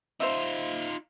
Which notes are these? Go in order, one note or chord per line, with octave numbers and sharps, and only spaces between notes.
D#4 F4 C5 E5